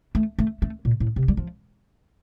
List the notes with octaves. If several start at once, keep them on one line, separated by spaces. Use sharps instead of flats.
A3
A3
A3
A#2
A2
C3
G3
F3